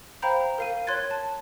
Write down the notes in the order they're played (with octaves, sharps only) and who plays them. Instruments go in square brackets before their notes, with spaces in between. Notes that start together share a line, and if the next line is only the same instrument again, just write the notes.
[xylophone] C5 F5 G5 A#5 B5 G6
A#4 F5 D#7
C#5 C6 F#6 G#6 A6
A5